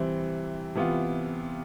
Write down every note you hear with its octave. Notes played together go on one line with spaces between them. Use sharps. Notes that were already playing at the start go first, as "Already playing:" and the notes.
Already playing: C3 E3 G3 C4 E4
C3 E3 B3 F4